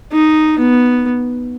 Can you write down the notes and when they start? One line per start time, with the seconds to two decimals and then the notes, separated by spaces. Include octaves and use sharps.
0.12 D#4
0.59 B3